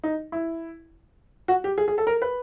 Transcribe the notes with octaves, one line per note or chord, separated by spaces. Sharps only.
D#4
E4
F#4
G4
G#4
G#4
A4
A#4
B4